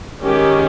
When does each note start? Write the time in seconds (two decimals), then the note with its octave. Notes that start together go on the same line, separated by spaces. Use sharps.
0.22 D#3 G#3 C#4 G4